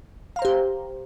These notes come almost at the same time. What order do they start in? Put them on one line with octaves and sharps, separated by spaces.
F5 A#5 C5 G4